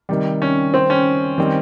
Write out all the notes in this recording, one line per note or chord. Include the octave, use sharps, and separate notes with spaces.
C3 D#3 G3
C#4
C4
C#4
D#3 G3 C4